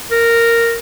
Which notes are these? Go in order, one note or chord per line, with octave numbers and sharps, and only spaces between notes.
A#4